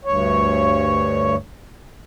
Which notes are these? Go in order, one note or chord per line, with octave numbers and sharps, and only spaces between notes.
D2 G2 C#5